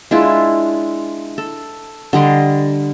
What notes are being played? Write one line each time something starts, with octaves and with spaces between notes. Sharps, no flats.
G#3 D4 E4 F4
A4
D3 G3 D#5 C6